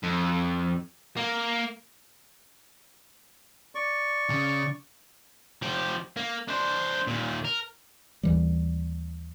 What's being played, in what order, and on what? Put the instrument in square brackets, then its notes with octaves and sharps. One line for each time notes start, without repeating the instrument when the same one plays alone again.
[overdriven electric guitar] F2
A#3
[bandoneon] D5 C#6
[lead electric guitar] C#3
[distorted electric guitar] F3 G4
A#3
D4 C5
D#2 A#2
A#4
[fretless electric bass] D#2 E3 G3